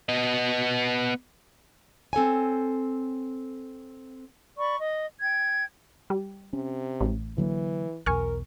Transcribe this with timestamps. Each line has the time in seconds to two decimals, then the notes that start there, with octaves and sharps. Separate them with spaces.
0.09 B3 D#5
2.13 C4 A4 C#5 G#5
4.58 D5 B5 C#6
4.79 D#5
5.21 G5 G#6
6.10 G3
6.53 C3 C#4
7.01 A1
7.38 D3 E3 F#3 A#3
8.06 B1 E2 B2 A#4 G#5 C#6 F6